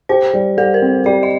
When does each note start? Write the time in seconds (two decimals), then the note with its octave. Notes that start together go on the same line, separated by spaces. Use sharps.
0.09 G4 C5
0.33 G3
0.57 G3 A4
0.74 A#4
0.82 C4
1.06 G4 D5
1.23 D#5